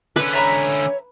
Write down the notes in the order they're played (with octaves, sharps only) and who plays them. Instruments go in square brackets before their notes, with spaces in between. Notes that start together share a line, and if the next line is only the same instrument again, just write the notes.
[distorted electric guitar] D3 C#4 [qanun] B4
[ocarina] C#5 [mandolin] E5 A#5 B5